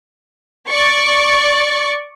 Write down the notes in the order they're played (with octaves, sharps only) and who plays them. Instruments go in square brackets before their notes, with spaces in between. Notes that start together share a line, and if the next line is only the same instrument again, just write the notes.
[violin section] D5 C#6